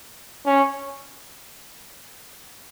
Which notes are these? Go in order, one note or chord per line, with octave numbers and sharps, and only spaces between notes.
C#4